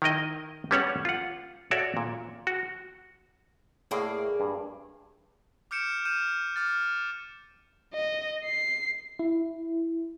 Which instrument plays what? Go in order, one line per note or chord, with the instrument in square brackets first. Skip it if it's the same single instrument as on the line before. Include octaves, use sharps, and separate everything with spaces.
[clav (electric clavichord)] D#3 E4 A#4 D#5
G3 B3 C#4 A4 C#5 F#5
F4 F#5
F#4 A4 C#5 D5 E5 F5
A#2
F#4
[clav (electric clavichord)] A2 [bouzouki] A#3 G#4 D5
[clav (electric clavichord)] G2
[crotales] D6 F6 G6 C#7 D7 E7
F6 G6 D#7 E7
D6 F6 A6
[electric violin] D#5
C7
[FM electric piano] E4